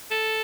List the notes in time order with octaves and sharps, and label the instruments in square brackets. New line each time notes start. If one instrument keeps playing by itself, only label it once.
[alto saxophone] A4